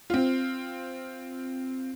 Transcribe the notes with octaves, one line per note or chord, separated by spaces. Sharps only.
C4 F4